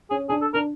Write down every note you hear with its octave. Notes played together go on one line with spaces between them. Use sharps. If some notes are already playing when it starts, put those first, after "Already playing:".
C#4 G#4
D4 G#4
A4
D4 A#4